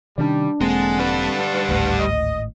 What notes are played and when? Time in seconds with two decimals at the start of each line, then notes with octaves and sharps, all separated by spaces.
0.18 C3 D#3 G3 C#4 D4 D5
0.61 E1 D3 G#3 A#3 C4 F#5 A5
0.99 G3 B4
1.69 G#1 D2 A2
1.99 D#5